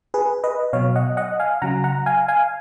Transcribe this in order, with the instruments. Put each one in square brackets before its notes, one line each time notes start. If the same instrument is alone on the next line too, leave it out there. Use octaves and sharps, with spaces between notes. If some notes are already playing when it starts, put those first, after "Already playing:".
[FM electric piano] G#4 B4
B4 D#5
B2 F#3 C#5 F5
D#5 F#5
D#5 F#5
F5 G#5
C#3 F#3 F#5 A#5
F#5 A#5
F5 G#5
F5 G#5